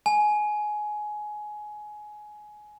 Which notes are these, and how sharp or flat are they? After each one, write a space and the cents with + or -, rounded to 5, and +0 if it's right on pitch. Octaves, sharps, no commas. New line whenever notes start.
G#5 +20